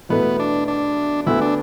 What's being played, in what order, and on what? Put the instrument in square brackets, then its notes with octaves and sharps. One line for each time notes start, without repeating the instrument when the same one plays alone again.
[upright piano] E2 B2 A3 E4 B4 [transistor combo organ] B3
[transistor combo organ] D4
D4
[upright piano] D2 D3 B3 [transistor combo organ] E4
[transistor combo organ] D4